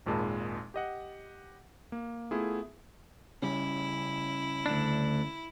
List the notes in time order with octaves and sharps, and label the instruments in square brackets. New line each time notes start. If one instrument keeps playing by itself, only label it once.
[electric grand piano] G#1 D#2 A#2 G#3 A5 B5
G4 D#5 F#5
A#3
A3 B3 E4 F4 G#4
[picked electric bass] C#3 G3 C#4 [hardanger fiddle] E4
[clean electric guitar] D2 D4